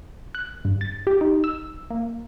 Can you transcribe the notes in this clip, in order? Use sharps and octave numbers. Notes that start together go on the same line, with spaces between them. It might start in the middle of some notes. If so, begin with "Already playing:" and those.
F#6
G2
A6
G4
D#4
E6
A#3